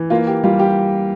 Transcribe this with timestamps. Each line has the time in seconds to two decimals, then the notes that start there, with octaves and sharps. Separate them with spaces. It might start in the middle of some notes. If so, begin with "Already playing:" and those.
Already playing: E3
0.10 A#3 F4
0.27 G4
0.44 G3 F4
0.59 G4